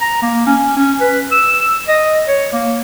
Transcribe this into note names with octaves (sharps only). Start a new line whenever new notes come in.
A#5
A#3
C#4
C#4
B4
E6
D#5
C#5
A#3